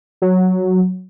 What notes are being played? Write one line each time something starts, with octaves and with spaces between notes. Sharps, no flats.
F#3